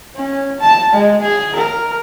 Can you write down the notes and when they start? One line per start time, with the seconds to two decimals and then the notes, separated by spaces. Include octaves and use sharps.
0.15 C#4
0.60 A5
0.93 G#3
1.22 G#4
1.56 A#4